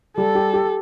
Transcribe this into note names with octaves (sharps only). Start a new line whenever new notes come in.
G3 A4
G4
G4